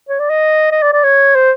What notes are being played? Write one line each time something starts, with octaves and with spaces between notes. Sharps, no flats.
C#5
D5
D#5
D#5
D5
D5
C#5
C5